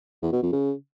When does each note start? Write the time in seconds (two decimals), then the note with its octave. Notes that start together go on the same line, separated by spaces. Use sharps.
0.23 E2
0.33 B2
0.43 F2
0.53 C#3